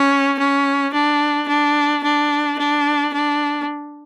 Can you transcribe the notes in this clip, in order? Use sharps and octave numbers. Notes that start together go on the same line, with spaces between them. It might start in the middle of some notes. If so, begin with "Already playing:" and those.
Already playing: C#4
C#4
D4
D4
D4
D4
D4